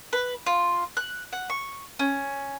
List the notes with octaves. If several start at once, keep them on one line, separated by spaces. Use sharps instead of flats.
B4
F4
F#6
F#5
C#6
C#4